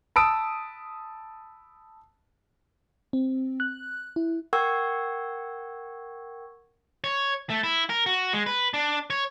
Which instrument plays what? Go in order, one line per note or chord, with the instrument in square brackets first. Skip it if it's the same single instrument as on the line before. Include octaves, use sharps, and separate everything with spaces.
[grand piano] A5 B5 D#6 E6 D7
[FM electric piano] C4
F#6
E4
[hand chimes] A#4 F#5 G5 C#6 E6 G#6
[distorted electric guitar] C#5
A3
E4
A#4
F#4
G#3
B4
D4
C#5